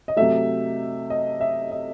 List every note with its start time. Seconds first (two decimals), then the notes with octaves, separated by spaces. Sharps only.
0.08 D#5
0.16 C3 F#3 A3 E5
1.10 D#5
1.41 E5
1.71 D#5